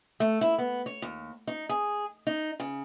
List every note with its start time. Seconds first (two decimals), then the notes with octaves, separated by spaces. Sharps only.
0.20 A3
0.41 E4
0.58 B3
0.86 C#5
1.02 D#2
1.47 D#4
1.69 G#4
2.27 D#4
2.60 C#3